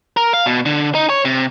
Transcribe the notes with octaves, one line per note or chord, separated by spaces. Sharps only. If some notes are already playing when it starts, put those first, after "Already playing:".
A#4
F5
B2
D3
D#4
C#5
C3